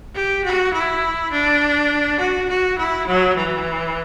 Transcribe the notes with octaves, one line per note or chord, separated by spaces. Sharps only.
G4
F#4
E4
D4
F#4
F#4
E4
F#3
E3